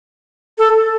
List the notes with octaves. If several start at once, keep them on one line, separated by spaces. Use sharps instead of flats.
A4